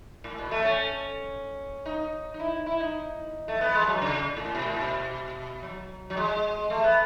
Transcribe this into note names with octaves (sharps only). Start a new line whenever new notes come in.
A2
B2
A3
C#4
D#4
D#4
E4
E4
D#4
A3
B3
G#3
F#3
C#3
A2
B2
A2
B2
F#3
F#3
G#3
A3
B3